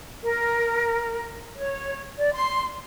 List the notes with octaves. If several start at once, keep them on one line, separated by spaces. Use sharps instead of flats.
A#4
C#5
D5
C6